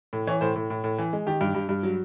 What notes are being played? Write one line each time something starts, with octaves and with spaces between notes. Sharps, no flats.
A2
E3 C#5
A2 C5
A2
A2
A2
E3
G#3
D#3 G4
G2
G2
G2
F#3